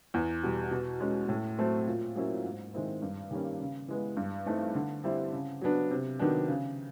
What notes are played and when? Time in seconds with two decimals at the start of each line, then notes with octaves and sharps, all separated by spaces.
0.14 E2
0.43 B2 G3
0.71 B2
1.00 G#3 C#4
1.29 A2
1.58 F#3 A3 C4
1.87 A#2
2.16 F#3 A#3 C#4 E4
2.44 G#2
2.74 D#3 G#3 C4 E4
3.02 G2
3.31 D#3 G3 A#3 C#4
3.60 C#3
3.88 E3 G#3 B3
4.17 G2
4.46 E3 A3 C4 D#4
4.75 D3
5.04 G3 C4 E4
5.33 C#3
5.61 F#3 B3 D4
5.91 C3
6.19 D#3 F#3 B3 D4
6.48 C#3